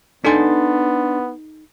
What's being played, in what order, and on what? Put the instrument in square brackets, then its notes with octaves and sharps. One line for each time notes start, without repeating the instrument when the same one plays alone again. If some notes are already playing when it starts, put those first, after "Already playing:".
[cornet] B3 [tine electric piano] D4 C6 A6 [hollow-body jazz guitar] D#4 A4 G#5